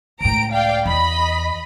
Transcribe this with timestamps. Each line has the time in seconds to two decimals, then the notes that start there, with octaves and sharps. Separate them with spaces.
0.21 C#2 A2 G5 A#5 D7
0.52 D5 F5 G5
0.86 E2 D#5 B5